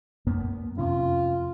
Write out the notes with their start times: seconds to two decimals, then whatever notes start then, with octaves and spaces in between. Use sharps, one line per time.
0.27 F#2 A#3 B3
0.78 F2 C3 C#4 F4